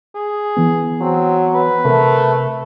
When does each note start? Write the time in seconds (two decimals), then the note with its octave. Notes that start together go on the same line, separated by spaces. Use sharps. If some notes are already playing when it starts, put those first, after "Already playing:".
0.15 G#4
0.57 E3 B3
1.01 F#3 C4
1.54 B4
1.85 C3 A3 A#4